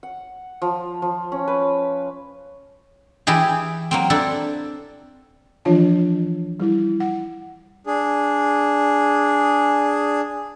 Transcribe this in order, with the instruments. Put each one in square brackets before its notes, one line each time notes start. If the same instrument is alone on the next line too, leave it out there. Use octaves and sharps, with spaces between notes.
[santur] F#5
F3
F3
C#4
B4
[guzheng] E3 E4 G4 G#4
F#3 A#3 C4
C4 D4 E4 A4
[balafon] E3 F3 D4 F4 C#5 A5
G3 E4
F#5
[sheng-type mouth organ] D4 G#4